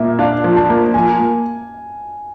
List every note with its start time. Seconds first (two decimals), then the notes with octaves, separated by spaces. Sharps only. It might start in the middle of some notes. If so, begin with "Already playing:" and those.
Already playing: A#2 A#3 E5
0.19 D4 F5
0.44 F3
0.56 A5
0.69 A#3
0.94 F3 G#5
1.19 A#3